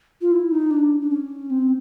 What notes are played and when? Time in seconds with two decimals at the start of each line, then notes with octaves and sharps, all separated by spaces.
0.21 F4
0.32 E4
0.51 D#4
0.71 D4
1.00 D4
1.10 C#4
1.50 C4